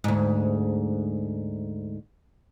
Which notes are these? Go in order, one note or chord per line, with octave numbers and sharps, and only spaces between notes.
D2 G#2